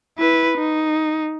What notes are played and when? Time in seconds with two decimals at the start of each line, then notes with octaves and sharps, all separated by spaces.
0.18 E4 B4
0.58 D#4